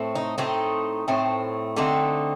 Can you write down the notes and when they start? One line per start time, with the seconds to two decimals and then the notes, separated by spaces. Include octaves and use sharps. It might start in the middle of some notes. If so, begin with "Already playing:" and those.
Already playing: A2 A3 C4
0.15 D#4
0.38 A2 A3 C4 D#4
1.08 A2 A3 C4
1.76 D3 A3 C4 D#4